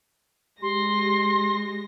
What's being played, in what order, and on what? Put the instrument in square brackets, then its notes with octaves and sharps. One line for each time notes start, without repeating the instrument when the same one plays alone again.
[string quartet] G#3 A#6 [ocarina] G4 [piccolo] C6